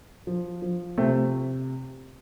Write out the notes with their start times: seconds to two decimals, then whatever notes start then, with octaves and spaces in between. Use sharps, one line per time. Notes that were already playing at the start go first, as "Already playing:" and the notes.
0.27 F3
0.62 F3
0.98 C3 A3 C4